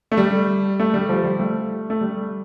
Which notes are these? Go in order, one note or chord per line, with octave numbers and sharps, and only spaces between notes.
A3
G3
A3
G3
F3
G3
A3
A3
G3